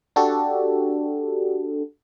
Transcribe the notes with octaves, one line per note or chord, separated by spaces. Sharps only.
D4 F#4 G4 A4